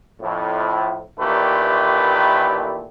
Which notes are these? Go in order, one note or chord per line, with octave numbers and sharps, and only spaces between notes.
F2 A2
A1 A#2 D#3 A3 G4 B4